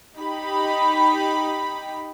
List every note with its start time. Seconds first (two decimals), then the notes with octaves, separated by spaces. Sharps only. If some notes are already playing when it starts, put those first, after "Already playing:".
0.17 D#4 G4 B5